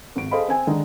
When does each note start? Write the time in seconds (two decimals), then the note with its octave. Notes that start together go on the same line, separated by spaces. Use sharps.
0.16 G#1 D7
0.31 G#4 A4 C5 D#5 F5 B5
0.48 C4 G#5
0.67 D3 D#3 G#3 D#4